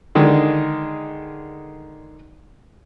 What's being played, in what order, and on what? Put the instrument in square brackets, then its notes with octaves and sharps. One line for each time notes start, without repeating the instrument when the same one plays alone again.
[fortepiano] D3 D#3 G#3 D4